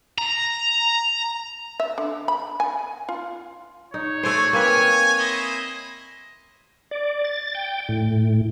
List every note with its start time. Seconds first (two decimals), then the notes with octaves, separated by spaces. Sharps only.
0.18 A#5
1.80 E5
1.98 D3
2.28 B5
2.60 G#5
3.09 F4
3.94 D#4 C#5
4.23 A3 C4 D4 C5 G#5
4.53 A#3 C4 B4 G#5
5.19 E4 C5 D#5
6.91 D5
7.25 A6
7.55 G5
7.89 A2